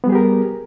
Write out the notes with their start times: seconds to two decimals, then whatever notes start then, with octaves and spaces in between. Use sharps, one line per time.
0.04 B3
0.07 G3
0.09 G#4
0.12 G4
0.15 A#4